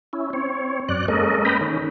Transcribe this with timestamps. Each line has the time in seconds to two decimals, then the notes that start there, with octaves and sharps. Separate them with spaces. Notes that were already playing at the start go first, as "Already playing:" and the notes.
0.13 C#4 E4
0.33 C4 C#5
0.89 F#2 D5 F#6
1.08 G#3 A#3 C#4 A4 A#4 D#5
1.45 B4 D#5 G5 A#5 B5
1.61 D#3 C#4